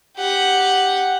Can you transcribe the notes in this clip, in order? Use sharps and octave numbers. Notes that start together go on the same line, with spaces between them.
G4 F#5